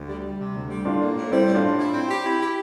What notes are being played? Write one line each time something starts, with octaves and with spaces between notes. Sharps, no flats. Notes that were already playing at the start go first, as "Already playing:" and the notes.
Already playing: D2
G3
G3
C3
D2
G3
A2 D4 F4
A#3
A2
G3 C4 E4
A2
D4 F4
A2
E4
C4
G4
E4
G4